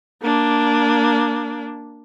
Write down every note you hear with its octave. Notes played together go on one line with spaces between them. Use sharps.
A#3 D4